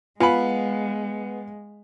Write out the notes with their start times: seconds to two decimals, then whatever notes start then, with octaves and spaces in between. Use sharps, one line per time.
0.20 G#3 B3 F4 F5 G#5 B5